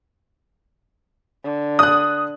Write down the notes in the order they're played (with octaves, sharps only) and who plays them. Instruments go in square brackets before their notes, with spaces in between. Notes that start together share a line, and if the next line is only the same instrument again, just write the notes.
[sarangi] D3
[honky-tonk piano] D#6 F#6